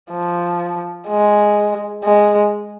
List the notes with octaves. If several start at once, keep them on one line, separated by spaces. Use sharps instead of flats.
F3
G#3
G#3